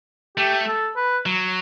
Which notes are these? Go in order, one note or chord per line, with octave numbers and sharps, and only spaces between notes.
A3 G4
A4
B4
F#3